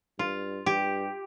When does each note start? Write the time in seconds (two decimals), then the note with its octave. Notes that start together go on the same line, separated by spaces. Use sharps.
0.19 G2 F4
0.66 G2 G4